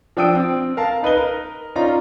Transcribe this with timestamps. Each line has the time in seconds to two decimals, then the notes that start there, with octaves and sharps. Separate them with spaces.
0.17 F3 D4 G5 D#6 E6 D7
0.35 C4
0.77 A#4 F5 A5
1.03 D#4 B4 D#5 G7
1.17 A#4
1.76 C#4 D#4 F4 D5 A#5